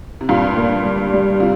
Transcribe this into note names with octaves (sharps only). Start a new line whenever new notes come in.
C3
G2 A#2 F4
A#3
G3
G3
C3 F4